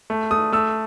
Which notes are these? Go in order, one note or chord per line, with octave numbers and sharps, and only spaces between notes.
A3
A3 D#6
A3 E6